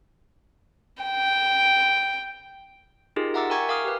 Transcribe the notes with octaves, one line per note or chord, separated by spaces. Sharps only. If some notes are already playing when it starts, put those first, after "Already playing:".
G5
D#4 F4 G4 G#4 A#4
E5 F#5 A#5 D6 E6 A6
A#4 G5 G#5 A#5 C#6 G#6
A#4 F5 D6 D#6 F6
G4 B4